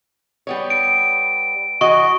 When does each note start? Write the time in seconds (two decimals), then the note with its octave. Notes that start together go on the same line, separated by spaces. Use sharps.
0.47 G3 B3 C#5
0.70 D7
1.81 E3 F#4 D#5 C#6